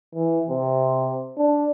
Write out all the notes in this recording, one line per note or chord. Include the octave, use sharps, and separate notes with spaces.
E3
C3
D4